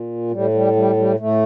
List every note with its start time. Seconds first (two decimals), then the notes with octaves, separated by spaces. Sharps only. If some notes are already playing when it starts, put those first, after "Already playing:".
Already playing: A#2
0.31 A2 G3
0.54 G3
0.76 G3
0.97 G3
1.19 A2 A3